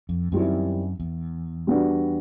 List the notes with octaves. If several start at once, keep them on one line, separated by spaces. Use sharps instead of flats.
F2
F#2 D#3 G3 C4 E4
E2
G3 B3 D4 F#4